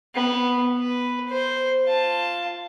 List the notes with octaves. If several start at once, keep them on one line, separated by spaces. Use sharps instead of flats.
B3
B4
C5
F4 A5